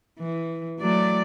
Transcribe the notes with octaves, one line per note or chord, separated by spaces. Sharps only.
E3
F#3 A3 D5